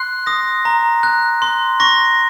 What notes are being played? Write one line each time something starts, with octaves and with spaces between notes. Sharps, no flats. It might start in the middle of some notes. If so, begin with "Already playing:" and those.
Already playing: C6 F#6 C7
D#6 A#6
A#5
F#6
C6
C#6 A#6